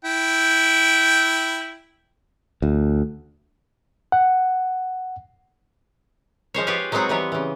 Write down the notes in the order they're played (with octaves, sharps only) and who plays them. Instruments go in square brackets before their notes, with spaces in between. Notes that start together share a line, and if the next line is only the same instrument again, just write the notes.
[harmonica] E4 G5
[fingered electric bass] D2
[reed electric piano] F#5
[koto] F3 G#3 C5 C#5
F4 G4 G#4 B4 C#5 F5
F#3 G#3 B3 C4 D#4 F#4
E3 G3 B3 C4 C#5
C#3 E3